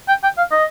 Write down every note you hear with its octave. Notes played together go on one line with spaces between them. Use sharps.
G5
G5
F5
D#5